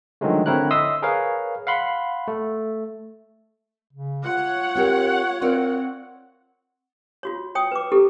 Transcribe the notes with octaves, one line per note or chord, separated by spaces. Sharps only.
D3 D#3 F3 F#3 G#3 A3
D3 C4 E4 A#4 C#5 F#6
D#5 E5 C6 D#6 E6
G#4 A#4 B4 C#5 F5
F5 F#5 B5 C6
A3
C#3
F4 C#5 F#5
C4 G4 A#4
C4 F4 A#4 D5
F4 F#4 C#5
C#5 G5 D#6
B4 D6
E4 G4 A4